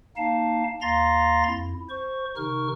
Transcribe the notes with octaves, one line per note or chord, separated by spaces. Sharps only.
A#3 D#4 F5 A5
D#2 F5 A#5 C6 A6 A#6
F2 E4
C5 C#6
C3 D#3 D#4 A#4 C#6 F6